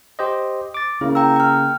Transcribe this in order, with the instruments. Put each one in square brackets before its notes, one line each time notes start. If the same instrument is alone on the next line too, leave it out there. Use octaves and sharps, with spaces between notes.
[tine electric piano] G4 C5 D#5
D6 A6
[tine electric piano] C#3 A#3 [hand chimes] E4
[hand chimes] G5 A#5 E6
G5 F6